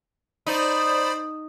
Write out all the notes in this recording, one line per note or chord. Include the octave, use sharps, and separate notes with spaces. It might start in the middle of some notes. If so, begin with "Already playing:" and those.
D#4 C5 D5 B5